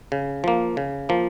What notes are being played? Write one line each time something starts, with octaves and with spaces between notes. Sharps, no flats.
C#3
F3 A#3
C#3
F3 A#3